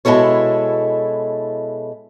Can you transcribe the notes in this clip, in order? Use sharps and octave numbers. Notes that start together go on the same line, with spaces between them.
B2 G#3 E4 A4 C#5